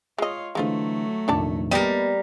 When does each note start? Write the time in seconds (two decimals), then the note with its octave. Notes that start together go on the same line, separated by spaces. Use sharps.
0.18 G#3 F4 C#5 D#5
0.55 D3 E3 F#3 G#3 A3 F4 C5
1.28 F1 A#1 D3 D#3 D5 A5
1.71 G3 A#3 B3 G4 A#4 D#5